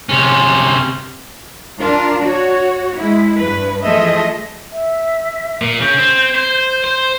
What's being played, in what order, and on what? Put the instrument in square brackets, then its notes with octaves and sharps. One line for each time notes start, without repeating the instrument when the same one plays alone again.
[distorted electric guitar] C3 C#4
[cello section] D4 F4 A#4
F#4 C#5
G#3 E4
G2 B4
E3 F3 A3 G#4 D#5 E5
[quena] E5
[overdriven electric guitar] A#2
[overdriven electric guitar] C#3 [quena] G6
[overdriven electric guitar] C4
C5
C5